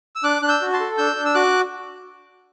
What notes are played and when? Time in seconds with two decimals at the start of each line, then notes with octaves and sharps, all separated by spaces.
0.16 E6
0.24 D4 D6 F#6
0.42 D4 F#6
0.48 E6 G6
0.62 F#4
0.73 A5 C6
0.80 A4
0.98 D4 E6 G6
1.16 D4
1.25 E6
1.34 F#4 D6 F#6